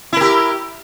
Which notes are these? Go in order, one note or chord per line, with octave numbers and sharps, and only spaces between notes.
E4 G4 A#4